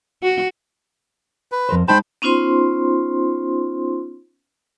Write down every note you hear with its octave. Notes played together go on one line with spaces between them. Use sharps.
F#4
B4
F2 A#4 C5
G#3 D#4 C5 G5 A5 B5
B3 C#4 D#4 F4 C5 C6